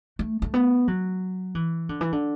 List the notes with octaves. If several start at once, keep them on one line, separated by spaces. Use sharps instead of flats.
A3
A3
B3
F#3
E3
D3
E3
D3